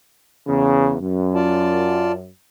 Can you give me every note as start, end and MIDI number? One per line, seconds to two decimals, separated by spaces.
0.48 0.94 40
0.48 0.94 49
1.01 2.27 42
1.35 2.12 65
1.35 2.12 74
1.35 2.12 81